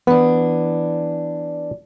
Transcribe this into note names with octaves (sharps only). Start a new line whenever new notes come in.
E3 B3 D4